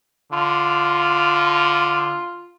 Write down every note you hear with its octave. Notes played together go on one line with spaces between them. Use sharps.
D3 F4